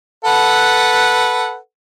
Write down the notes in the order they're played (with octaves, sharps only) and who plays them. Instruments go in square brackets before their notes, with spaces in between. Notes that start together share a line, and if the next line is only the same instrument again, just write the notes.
[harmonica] A4 B4 F#5